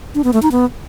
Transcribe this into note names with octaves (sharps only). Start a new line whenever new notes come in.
D4
B3
A3
D#4
B3